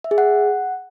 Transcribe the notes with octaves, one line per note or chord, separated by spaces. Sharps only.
E5
G#4
F#5